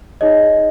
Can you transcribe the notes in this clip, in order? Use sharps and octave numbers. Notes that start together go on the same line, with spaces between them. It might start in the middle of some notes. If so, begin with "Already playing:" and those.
D#4 G#4 C#5 D#5